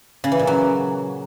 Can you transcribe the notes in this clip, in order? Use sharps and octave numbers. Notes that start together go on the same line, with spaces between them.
C#3
E3
A#2
F#3